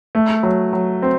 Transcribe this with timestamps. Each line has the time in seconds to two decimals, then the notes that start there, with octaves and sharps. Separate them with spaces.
0.15 A3
0.43 F#3
0.73 F#3
1.02 C4